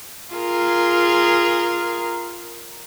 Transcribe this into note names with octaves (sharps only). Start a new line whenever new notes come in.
F4 G#4 A#4